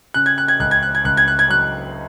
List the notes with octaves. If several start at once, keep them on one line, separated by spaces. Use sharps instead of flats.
C#3 F#6
G#6
F#6
G#6
C#2 F#6
G#6
F#6
G#6
C#2 F#6
G#6
F#6
G#6
F#3 F#6